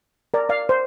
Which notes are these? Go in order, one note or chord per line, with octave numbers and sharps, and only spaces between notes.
A#4 D5
D5 F5
C5